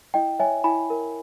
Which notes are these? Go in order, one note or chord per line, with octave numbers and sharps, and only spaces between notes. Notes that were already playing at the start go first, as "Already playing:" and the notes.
E4 D#5 G5
C#5 E5 G#5
E4 G#5 B5
A#4